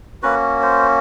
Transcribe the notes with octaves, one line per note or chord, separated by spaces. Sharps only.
A#3 C#4 F#4 B4
C5